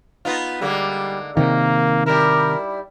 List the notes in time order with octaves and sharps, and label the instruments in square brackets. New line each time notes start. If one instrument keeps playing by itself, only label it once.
[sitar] B3 D#4 F4
[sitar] D3 G#3 A#3 [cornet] G3
[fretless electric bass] C3 D#3 [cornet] A#3 [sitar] D#4
[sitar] G3 E4 [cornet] A#4